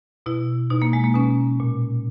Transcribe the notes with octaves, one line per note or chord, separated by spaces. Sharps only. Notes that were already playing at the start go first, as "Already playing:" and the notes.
B2 E4
B2 D#4
A#3
G#3
A#3
B2 C#4
A#2